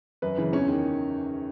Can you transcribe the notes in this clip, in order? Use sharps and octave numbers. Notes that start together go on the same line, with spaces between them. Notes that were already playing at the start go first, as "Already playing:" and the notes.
F#2 B4
C#3 E3
E2 C#4
D#3